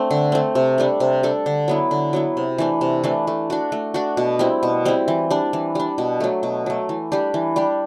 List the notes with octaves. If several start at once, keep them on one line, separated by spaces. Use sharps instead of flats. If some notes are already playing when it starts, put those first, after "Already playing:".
Already playing: A3 C4 D4
D3
A3 C4
C3
G3 D4 A4
C3
G3 D4 A4
D3
F#3 B3 E4
D3
F#3 B3 E4
C3
E3 A3 D4
C3
E3 A3 D4
A3
D4 F#4
A3
D4 F#4
B2
G3 C4 E4
B2
G3 C4 E4
E3
G3 D4
E3
G3 D4
B2
F#3 A3
B2
F#3 A3
E3
G3 D4 G4
E3
G3 D4 G4